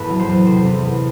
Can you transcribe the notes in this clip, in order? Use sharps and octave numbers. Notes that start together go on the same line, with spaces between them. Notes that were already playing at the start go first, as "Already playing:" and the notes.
Already playing: E2 A2 B3 A4 B4
F#3
C5
E2
C3 C5
E2
E2